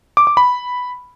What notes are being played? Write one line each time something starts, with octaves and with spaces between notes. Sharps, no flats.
D6
D6
B5